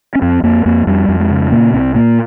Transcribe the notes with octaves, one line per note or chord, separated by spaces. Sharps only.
C#4
F2 C4
F2 A#3
F2 A#3
F2 G3
F2
G#3
C#3
A#2 A#3
C2 C4
A#2 A#3